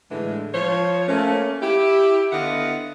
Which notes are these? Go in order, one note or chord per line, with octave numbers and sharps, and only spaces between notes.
A2 D3 E3 G#3
F3 C5 C#5
A3 A#3 C#4
E4 G4
D3 B3 E4 D#5 F5 F#5